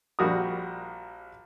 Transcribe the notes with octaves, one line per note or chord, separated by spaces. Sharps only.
A#1 G3 F#4 A#4 D#6